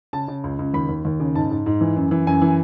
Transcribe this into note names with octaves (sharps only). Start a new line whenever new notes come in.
C#3 A5
C#3
C#2
C#2
D#2 B5
D#2
D#2
C#3
G#2 A5
G#2
G#2
E3
F#2
E3
F#2 G#5
E3